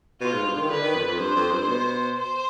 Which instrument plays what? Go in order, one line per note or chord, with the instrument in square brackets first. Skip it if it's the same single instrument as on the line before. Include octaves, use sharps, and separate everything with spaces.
[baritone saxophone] B2 [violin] F4
[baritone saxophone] G#2
G2
D#3
[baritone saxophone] D3 [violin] B4
[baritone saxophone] D#3
F2
F2
[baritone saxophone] G2 [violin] C5
[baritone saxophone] F2
G2
B2
[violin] C5